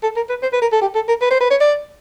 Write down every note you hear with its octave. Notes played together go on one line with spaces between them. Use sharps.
A4
A#4
B4
C5
B4
A#4
A4
G4
A4
A#4
B4
C5
B4
C#5
D5